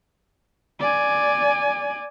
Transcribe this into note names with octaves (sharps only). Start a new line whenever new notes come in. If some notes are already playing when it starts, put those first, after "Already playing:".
D5 G#5